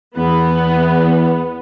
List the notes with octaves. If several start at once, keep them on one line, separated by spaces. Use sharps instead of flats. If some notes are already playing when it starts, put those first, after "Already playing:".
E2 B3